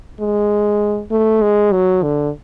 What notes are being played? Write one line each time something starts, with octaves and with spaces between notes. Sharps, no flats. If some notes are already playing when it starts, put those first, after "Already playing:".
G#3
A3
G#3
F#3
D3